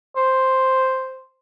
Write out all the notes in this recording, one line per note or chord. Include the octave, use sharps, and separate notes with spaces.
C5